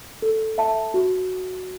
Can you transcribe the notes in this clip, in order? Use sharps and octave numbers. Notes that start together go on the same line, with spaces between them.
A4
E5 A5
F#4